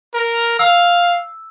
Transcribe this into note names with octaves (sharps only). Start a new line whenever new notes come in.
A#4
F5 E6